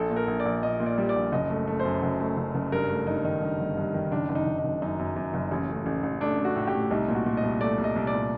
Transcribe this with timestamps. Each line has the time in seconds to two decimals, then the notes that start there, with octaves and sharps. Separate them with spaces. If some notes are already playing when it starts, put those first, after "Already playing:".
Already playing: A#1 A4
0.10 A#2
0.16 A#4
0.28 A#1
0.40 D5
0.45 A#1
0.63 A#2 D#5
0.80 A#2
0.86 D5
0.98 G3
1.09 D5
1.16 A#1
1.32 F#1 D#5
1.50 A3
1.67 A3
1.79 C5
1.85 F#2
2.02 F#1
2.20 A3
2.37 F#1
2.55 F#1
2.72 G2 A#4
2.89 A3
3.07 G2 D#4
3.24 D#3 D#4
3.42 G2
3.60 G1
3.77 G2
3.94 D#3
4.12 F#1 D4
4.29 F#1
4.35 D#4
4.47 F#1
4.58 D#4
4.64 F#1
4.82 F#2 D#4
4.99 F#2
5.16 F#2
5.34 F#1
5.51 A1
5.69 A3
5.86 A1
6.03 A1
6.21 A3 D4
6.39 A3
6.45 F#4
6.56 A2
6.67 G4
6.73 A2
6.91 C2 D#4
7.08 A#2
7.14 F#4
7.26 A#2
7.37 D#5
7.43 C2
7.61 A3 D5
7.78 C2
7.84 D#5
7.96 C2
8.07 D5
8.13 A#2